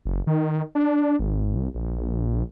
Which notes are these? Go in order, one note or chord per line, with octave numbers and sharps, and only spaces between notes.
F#1
D#3
D4
G#1
C2
A#1